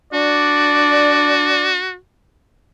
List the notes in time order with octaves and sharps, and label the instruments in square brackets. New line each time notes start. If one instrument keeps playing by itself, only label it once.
[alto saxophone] D4 [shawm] F#4 [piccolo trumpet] D5